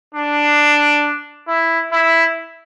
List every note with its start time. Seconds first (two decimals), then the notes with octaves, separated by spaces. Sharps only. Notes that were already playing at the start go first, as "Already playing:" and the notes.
0.15 D4
1.47 E4
1.92 E4